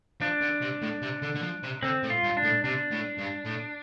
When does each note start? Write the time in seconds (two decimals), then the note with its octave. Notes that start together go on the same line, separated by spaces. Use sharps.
0.21 F3 D4
0.41 D3
0.61 C3
0.82 A2
1.02 C3
1.22 D3
1.35 D3
1.42 F3
1.63 C3
1.83 D3 C4
2.03 A2
2.10 F4
2.23 G2
2.37 D4
2.44 A2
2.64 C3 D4
2.91 A2
3.18 G2
3.45 A2